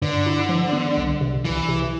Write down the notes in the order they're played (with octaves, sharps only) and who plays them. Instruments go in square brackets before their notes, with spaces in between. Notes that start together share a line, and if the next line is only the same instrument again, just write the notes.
[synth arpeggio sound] G2 [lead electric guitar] D3
[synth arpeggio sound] E4
F3
B3
C2
C3
[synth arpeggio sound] C2 [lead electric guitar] E3
[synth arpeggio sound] C3